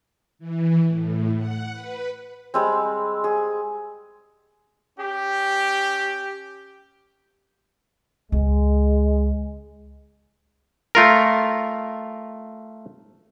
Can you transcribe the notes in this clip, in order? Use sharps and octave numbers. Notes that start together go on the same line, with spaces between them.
E3
A2
F#5
B4
G3 G#3 C4
G#4
C#4 G4
C#2 G#3
A3 F4 A#4